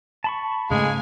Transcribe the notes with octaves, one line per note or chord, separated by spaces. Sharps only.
A5 B5 C#6
G#2 C#3 G#3 A3 F5 G#5